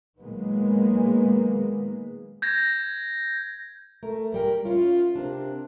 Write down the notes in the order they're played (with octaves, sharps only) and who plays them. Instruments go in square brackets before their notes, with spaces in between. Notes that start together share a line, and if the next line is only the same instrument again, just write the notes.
[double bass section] A#2 D#3 F#3 G#3 A#3 B3
[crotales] G6 G#6 A#6
[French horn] A3 [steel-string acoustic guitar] A#4
[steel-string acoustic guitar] G2 G3 G5 [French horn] A#4
[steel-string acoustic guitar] C#4 E4 [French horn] F4
[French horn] C3 [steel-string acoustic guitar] D4 A#4